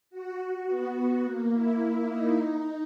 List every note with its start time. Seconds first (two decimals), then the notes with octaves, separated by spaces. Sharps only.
0.11 F#4
0.39 F#4
0.67 B3
0.96 B3
1.24 A#3
1.52 E4
1.80 E4
2.08 D#4
2.36 D#4